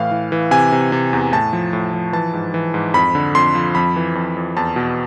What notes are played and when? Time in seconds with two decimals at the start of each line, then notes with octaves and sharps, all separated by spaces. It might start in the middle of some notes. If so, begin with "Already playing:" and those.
Already playing: A2 E3 F5
0.11 E3
0.32 E3
0.51 C3 G#5
0.72 C3
0.92 C3
1.13 E2
1.32 A2 A5
1.53 F3
1.73 A2
1.94 F3
2.13 E3 A5
2.33 G#2
2.54 E3
2.74 G#2
2.94 F2 B5
3.15 D3
3.35 F2 C6
3.55 F3
3.75 F2 B5
3.96 E3
4.15 F2
4.37 F2
4.57 E2 A5
4.76 B2